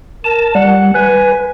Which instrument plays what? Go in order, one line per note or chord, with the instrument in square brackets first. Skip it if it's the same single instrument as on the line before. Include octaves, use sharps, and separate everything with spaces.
[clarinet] A#4 [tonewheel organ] A5
[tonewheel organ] G3 [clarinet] F#5
[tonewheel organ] B4 [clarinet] G#5